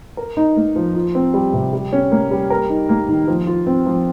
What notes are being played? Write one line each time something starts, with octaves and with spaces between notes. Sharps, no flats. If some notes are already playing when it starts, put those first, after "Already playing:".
A#4
D#4
A#3
F3
F4
C4
G3
C3
G3
C#4
A#3
G3
A#4
D#4
A#3
D#3
F3
F4
C4
F3